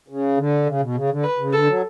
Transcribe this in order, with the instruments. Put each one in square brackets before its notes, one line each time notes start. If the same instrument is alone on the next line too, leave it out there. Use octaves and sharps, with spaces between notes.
[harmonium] C#3
D3
C#3
B2
C#3
D3
[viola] B4
[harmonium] C#3
[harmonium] D3 [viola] A4
[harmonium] F#3